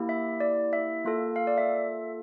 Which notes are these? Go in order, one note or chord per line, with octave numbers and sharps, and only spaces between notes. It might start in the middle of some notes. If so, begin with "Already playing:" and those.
Already playing: A#3 E4 G4
E5
D5
E5
A#3 F4 A4
F5
D5
E5